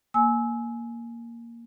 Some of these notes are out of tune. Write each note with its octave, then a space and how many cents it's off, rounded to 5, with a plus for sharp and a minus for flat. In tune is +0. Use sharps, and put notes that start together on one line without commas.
A#3 +0 G#5 +20 E6 -20